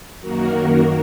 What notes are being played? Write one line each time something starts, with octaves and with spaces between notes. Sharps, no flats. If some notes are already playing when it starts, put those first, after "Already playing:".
F#2 D#3 A#3 F#4 A#4